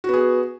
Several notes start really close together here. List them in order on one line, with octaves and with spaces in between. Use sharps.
F#4 B3 G#4